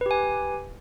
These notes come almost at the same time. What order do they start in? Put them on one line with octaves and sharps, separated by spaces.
B4 G4 G#5